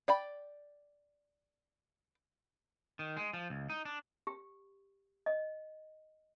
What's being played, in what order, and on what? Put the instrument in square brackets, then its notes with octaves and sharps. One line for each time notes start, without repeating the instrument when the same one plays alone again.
[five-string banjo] D5 G5 B5
[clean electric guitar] D#3
G#3
F3
C#2
D#4
D4
[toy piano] G4
D#5